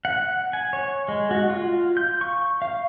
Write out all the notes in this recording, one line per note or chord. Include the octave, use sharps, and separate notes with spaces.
F#5
G#5
C#5
G#3
F#4
F4
G6
C#6
F5